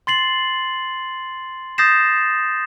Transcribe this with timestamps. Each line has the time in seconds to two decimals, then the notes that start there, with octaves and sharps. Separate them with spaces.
0.07 C6 A6 C7 F#7
1.78 D#6 G6 A6 A#6 C7 E7